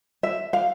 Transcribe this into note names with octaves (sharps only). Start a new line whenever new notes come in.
E5
F5